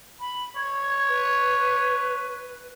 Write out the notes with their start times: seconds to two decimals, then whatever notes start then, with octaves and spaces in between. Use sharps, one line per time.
0.20 B5
0.56 C#5 G#6
1.09 B4